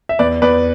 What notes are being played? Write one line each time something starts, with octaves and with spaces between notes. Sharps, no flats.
E5
E2 B4 D5
E2 B4 D5